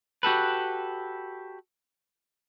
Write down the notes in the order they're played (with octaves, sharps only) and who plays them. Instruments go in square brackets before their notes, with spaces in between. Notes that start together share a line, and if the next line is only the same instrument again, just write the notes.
[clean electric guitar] F#4 G4 A4 B4